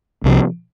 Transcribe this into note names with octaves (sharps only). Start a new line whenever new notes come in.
C2 C3 F3